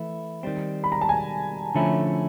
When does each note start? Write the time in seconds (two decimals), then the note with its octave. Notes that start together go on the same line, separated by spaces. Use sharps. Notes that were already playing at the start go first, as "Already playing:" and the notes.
Already playing: E3 A3 E4
0.43 D#3 G3 C4
0.84 B5
0.92 A#5
1.01 A5
1.09 G#5
1.75 D3 F3 A3 C#4 E4